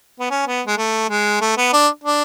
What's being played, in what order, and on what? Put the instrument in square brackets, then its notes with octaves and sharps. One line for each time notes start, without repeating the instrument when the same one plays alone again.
[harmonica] B3
C#4
B3
G#3
A3
G#3
A3
B3
D4
D4